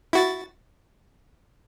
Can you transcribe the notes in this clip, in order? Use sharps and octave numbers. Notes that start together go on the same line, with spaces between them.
E4 F#4 A6